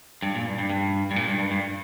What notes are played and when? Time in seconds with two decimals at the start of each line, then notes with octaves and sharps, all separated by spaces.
0.22 G2
0.35 A#2
0.46 G2
0.58 G2
0.70 G2
1.11 G2
1.16 A#2
1.28 G2
1.39 G2
1.51 G2